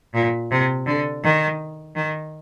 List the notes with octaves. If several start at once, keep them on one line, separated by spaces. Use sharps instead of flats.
A#2
C3
D3
D#3
D#3